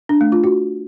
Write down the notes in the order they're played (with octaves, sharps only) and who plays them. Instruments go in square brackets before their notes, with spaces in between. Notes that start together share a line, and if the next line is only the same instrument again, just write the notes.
[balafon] D4
A3
F4
F#4